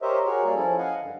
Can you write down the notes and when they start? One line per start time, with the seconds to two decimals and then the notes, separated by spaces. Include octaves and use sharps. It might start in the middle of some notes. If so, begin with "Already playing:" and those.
0.02 G4 A#4 C5 C#5 D#5 E5
0.26 F#4 G#4 A#4 C#5
0.44 G3 A#3 G#4
0.56 F3 C#4 E4 A4
0.78 D#5 F5 F#5 G#5
1.01 G2 D3